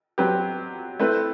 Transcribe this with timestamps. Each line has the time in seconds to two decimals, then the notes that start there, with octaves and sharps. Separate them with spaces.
0.18 F#3 C4 G4 B4
0.99 A3 C4 E4 B4